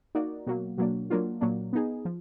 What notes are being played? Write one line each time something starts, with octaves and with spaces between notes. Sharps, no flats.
A#3 D#4 F#4 D5
B2 F#3 A#3
B2 F#3 A#3 D4
F#3 A#3 D4 F4
A#2 F#3 A#3 D4
B3 D#4 G#4
F3